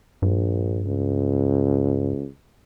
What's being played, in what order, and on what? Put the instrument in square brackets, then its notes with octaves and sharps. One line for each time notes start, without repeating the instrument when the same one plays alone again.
[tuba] A#1 [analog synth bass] G2
[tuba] C#2